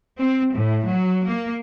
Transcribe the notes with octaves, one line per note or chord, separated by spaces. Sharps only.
C4
A2
F#3
A#3